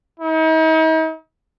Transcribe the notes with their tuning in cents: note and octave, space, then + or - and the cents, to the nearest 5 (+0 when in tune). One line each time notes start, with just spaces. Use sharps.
D#4 +45